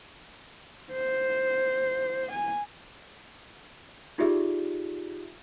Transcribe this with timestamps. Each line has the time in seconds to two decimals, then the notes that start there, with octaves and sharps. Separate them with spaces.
0.92 C5
2.32 G#5
4.18 D#4 F4 G4 G#4 D5 E5